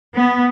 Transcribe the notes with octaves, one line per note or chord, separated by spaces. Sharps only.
B3